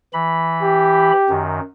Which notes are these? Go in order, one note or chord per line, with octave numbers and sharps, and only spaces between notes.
E3 B5
G4
F#2 D#3